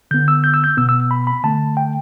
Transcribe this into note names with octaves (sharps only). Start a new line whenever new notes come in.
D3 B3 G6
E6
G6
E6
G6
B2 B3 E6
E6
B5
B5
D3 A3 A5
G5